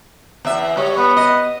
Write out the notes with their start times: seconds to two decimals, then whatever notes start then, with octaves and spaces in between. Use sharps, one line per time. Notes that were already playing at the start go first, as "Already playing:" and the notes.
0.45 E2 E5
0.77 G3 C#5
0.97 B3
1.17 D#5